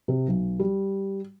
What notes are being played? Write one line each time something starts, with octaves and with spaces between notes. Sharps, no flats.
C3
B1
G3